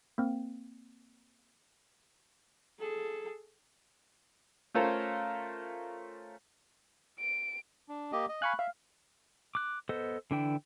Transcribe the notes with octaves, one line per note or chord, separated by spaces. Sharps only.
A#3 C4
G#4 A4
A3 C#4 F4 A4 A#4 C5
D7
D4
A#3 G4 D#5
D#5
F5 G#5 B5 C#6 F#6
E5 F5
D6 F#6
B3 A4 C5 D#5
D3 E3 D4 E4 G5